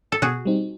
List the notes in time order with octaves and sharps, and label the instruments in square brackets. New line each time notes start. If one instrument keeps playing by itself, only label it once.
[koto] A4
[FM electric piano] B2 [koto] F#4 G#4
[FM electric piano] G3 C4 D#4